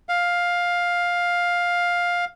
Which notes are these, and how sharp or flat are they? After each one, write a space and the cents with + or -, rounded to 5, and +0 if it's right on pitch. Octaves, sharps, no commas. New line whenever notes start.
F5 +10